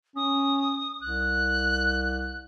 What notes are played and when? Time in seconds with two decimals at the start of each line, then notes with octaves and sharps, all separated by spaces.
0.16 C#4 D#6
1.01 C2 F#6